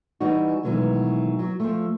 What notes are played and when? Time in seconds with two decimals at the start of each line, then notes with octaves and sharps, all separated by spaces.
0.20 E3 G3 D#4 F#4
0.63 B2 D#3 E3 F#3 G#3 A3
1.39 F#3
1.60 F3 A3